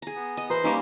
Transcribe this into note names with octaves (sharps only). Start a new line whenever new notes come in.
G#4 A#5
B3
D#5
E3 B4 C5 A#5
G3 A#3 C#4 D#4